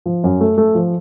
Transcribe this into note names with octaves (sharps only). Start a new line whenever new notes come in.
F3
F#2
A3
A3
F3